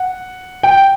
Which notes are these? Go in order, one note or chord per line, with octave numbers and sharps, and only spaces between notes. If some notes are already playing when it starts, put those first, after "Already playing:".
Already playing: F#5
G5